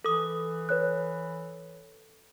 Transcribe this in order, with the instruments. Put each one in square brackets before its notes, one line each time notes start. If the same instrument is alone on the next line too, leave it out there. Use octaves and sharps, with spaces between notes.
[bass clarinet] E3 [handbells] A4 D#6
[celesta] B4 C#5 F#6